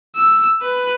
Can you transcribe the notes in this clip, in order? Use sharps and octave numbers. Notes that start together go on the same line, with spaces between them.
E6
B4